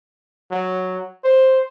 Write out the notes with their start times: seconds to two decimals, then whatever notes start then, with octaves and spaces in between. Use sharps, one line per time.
0.51 F#3
1.24 C5